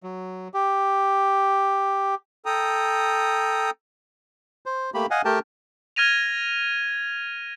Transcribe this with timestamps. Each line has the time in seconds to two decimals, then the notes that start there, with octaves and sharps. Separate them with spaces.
0.03 F#3
0.54 G4
2.46 A4 G5 A#5 D#6
4.66 C5
4.94 A3 A#3 G4 B5
5.11 D#5 F5 F#5 G#5
5.25 A3 G4 A#4 G5 A5
5.96 F6 G#6 A#6 D#7 F7